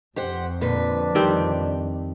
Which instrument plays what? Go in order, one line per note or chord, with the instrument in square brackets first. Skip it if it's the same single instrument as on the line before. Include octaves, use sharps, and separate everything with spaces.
[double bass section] F2 [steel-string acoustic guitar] G4 C5 F#5
[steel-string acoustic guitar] A#2 D3 B4 [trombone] D4
[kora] D#3 G3 C4